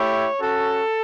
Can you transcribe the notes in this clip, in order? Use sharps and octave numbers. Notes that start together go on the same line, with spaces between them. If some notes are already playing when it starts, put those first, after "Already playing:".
Already playing: A3 E4 G4 C#5
C#4 F#4 A4